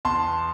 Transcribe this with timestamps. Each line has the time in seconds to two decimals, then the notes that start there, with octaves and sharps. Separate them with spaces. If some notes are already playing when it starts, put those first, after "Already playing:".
0.05 E2 A5 C6